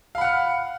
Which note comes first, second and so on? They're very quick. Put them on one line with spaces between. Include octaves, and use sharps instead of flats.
F5 B5 F#5 F6